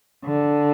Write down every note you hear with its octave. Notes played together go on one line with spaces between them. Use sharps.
D3